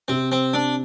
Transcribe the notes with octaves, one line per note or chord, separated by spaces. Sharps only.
C3 C4
C4
C4 D4